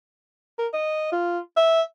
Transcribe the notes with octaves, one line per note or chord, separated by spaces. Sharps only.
A#4
D#5
F4
E5